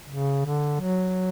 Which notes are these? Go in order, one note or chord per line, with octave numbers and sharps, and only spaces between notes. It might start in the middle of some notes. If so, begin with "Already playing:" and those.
C#3
D3
F#3